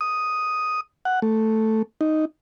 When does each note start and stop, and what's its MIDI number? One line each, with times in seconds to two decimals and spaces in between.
0.01 0.81 87
1.05 1.20 78
1.22 1.82 57
2.01 2.25 63